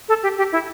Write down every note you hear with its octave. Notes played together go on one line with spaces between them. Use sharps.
A4
G4
G4
E4